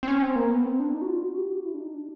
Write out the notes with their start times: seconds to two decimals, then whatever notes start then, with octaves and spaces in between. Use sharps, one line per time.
0.03 C4
0.08 C#4
0.22 C4
0.36 A#3
0.51 B3
0.65 C4
0.80 D4
0.94 D#4
1.02 F#4
1.07 F4
1.22 F#4
1.37 G4
1.52 F#4
1.65 E4
1.74 D4
1.80 D#4
1.94 D4